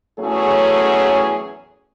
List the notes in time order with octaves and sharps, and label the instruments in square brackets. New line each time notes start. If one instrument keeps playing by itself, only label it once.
[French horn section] E2 A2 F#3 A3 C#4 G#4